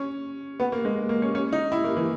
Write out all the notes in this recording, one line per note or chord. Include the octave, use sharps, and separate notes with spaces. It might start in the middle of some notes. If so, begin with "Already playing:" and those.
Already playing: C#4
B3
A#3
G#3
A#3
C#4
C#4
D#4
E4
A#3
E3